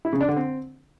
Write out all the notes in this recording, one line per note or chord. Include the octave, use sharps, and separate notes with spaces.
E4
C#3
D4
D3
C4